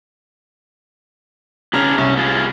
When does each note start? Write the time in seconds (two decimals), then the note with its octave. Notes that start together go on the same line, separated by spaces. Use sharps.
1.73 C#3 B3 D4 G#4 A#5 F6
1.98 C2 C#4
2.17 B3 F4 G#4